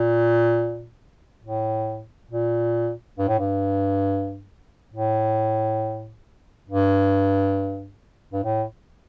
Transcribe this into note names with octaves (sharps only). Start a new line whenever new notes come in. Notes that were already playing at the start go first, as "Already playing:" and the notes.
Already playing: A#2
A2
A#2
G2
A2
G2
A2
G2
G2
A2